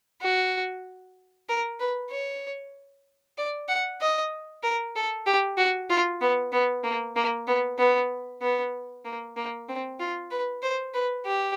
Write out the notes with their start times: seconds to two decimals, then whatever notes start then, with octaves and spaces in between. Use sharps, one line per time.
0.22 F#4
1.49 A#4
1.80 B4
2.11 C#5
3.38 D5
3.69 F#5
4.01 D#5
4.63 A#4
4.96 A4
5.26 G4
5.58 F#4
5.90 F4
6.21 B3
6.52 B3
6.84 A#3
7.16 A#3
7.47 B3
7.79 B3
8.42 B3
9.05 A#3
9.37 A#3
9.69 C4
10.00 F4
10.31 B4
10.63 C5
10.94 B4
11.26 G4